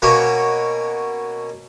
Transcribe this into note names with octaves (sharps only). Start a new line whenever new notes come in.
B2 A#3 C#4